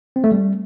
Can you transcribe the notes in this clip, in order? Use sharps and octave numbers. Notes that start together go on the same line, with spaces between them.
C4
A3
G3